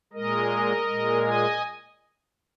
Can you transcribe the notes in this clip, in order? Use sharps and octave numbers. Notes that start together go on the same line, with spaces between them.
A#2 G#3 A#4 D#5
A#2 G#3
D#5 G#5